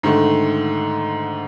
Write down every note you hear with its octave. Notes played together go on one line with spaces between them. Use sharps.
G#2 D3 D#3 A3